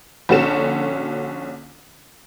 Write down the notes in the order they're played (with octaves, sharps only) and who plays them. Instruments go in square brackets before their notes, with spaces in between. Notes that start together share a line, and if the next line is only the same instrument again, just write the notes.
[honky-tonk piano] A#1 D3 C#4 F#4 A4 E7